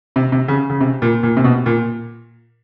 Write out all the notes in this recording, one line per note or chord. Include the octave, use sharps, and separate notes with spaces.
C3
C3
C#3
C#3
C3
A#2
A#2
C3
B2
A#2